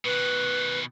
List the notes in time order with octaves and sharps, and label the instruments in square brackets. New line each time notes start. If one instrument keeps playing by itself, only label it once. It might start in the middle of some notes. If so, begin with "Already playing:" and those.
[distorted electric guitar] B2 D#3 [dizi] B4